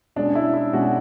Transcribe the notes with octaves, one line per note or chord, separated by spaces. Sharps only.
B2 G#3 C#4 D4
E4
E4
B2 G#3 C#4 F#4